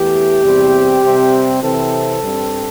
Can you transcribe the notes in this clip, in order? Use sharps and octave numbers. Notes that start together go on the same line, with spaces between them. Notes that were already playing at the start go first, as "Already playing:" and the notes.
Already playing: E2 E3 A3 G4
E2 C3 G3 C4
C3 G3 C4
C3 E3 C4 A4
G2 G3 C4